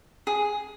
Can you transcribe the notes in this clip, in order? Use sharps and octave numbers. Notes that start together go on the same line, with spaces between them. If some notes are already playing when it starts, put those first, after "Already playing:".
G#4